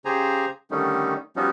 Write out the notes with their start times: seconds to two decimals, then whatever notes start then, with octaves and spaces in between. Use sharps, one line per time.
0.05 C#3 G4 G#4 C5 G#5 A#5
0.71 D3 D#3 G3 A3 C#4 D#4
1.36 F3 G3 B3 C#4 D#4 F#4